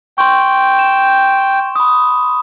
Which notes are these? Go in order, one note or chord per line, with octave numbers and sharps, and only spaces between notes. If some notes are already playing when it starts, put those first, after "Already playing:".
G5 C6 C#6
E7
B5 D#6